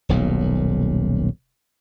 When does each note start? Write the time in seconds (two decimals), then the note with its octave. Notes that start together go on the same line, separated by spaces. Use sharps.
0.09 D#1 B1 A#2